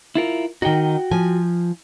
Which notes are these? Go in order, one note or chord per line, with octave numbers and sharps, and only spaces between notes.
E4 F4 A#4
D#3 D#4 F#4 G5
F3 G#5